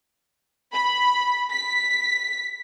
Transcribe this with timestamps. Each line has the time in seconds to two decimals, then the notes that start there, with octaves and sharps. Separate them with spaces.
0.73 B5
1.51 B6